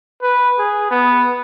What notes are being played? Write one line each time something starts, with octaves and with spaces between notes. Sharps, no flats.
B4
G#4
B3